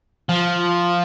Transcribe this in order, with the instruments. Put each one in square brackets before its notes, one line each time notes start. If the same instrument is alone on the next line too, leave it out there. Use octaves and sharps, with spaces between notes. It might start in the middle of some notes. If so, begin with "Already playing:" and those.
[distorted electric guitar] F3